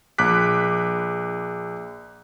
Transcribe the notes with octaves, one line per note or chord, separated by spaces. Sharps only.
A#1 D6 F#6 B6